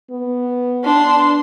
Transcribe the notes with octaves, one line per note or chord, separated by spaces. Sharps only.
B3
D4 C6